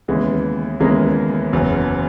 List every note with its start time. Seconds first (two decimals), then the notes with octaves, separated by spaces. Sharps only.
0.08 D#2 C#3 E3 G#3 B3
0.80 D#2 C#3 E3 G#3 B3 A#4
1.53 F#1 E2 C#3 F#3